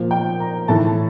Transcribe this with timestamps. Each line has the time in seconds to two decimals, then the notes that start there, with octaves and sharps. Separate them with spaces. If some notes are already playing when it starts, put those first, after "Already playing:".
Already playing: A#2 F3
0.11 G5
0.40 A#5
0.68 A2 E3 A5